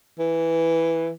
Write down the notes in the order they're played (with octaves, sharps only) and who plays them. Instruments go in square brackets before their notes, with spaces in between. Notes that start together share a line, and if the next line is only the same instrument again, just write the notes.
[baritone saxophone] E3